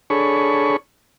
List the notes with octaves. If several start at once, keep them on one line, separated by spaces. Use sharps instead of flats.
D4 G#4 A4 C#5 B5 C#6